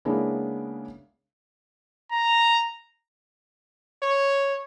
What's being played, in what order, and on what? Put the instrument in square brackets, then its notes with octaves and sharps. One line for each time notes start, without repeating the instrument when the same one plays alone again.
[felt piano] C#3 G#3 A#3 B3 D4 E4
[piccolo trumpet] A#5
[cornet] C#5